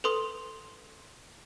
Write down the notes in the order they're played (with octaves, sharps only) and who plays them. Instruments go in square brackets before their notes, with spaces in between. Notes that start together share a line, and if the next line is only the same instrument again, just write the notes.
[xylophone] A4 B4 C6 D#6